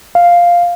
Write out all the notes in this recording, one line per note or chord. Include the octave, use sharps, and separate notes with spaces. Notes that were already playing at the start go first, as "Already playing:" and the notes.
F5